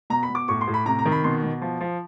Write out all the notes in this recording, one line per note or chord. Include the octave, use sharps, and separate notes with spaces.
B2 A#5
B5
B2
D6
A2 C#6
C6
A2
B5
C3 A#5
A#5
D#3
B5
B2 C6
B2
F3
F3